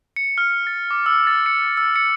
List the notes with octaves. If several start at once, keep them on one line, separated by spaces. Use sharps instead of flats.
C#7
F6
A6
D6
E6
A6
C#7
E6
C#7